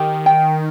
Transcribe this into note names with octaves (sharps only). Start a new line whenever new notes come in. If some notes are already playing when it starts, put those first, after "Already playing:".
Already playing: D#3 G4
G5